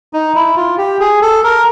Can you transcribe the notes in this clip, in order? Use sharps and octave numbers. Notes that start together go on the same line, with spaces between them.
D#4
E4
F4
G4
G#4
A4
A#4